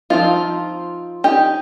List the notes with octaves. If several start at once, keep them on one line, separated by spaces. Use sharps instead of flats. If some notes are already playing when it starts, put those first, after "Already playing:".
F3 C4 D#4 F4
D#4 G4